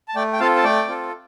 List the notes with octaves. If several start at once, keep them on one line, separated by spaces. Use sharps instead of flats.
A5
A3 D5 G5
G5
C4 F4 A4 F5 A5
A5
A3 D5 G5
C4 F4 A4